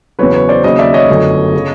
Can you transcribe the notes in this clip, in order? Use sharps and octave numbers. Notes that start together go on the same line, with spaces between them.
E2 C#3 F#3 B4 C#5
B4 C#5
C5 D5
D#2 C#3 F#3 C#5 D#5
D5 E5
C#5 D#5
G1 F#2 D3 F#3 A3
C#3